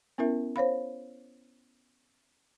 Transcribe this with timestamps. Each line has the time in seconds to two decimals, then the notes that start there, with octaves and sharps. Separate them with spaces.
0.18 B3 C#4 E4 A#4 E5
0.56 C5 C#5 F5 B5